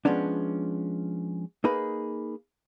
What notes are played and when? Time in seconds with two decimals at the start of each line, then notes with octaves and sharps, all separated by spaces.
0.05 F3 G#3 B3 C#4 D4
1.64 A#3 D#4 G#4 B4